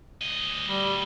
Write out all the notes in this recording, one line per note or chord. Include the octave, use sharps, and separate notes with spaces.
D2 D#5
G3